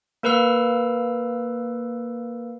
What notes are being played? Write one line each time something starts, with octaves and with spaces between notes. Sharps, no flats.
A#3 A#4 B4 F5 E6